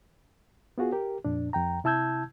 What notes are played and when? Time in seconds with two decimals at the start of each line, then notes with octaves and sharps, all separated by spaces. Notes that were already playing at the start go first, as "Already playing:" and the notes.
0.78 B3 F4 F#4 G#4
0.92 G4 A#4
1.25 F2 A#2 D4
1.53 F2 G5 A#5
1.84 C3 E4 A5 E6 G6 G#6